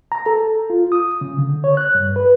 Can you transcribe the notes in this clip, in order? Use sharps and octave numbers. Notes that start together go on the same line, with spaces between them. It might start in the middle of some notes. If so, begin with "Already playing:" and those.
A#5
A4
F4
D#6
C#3
D3
C#5
F#6
G2
B4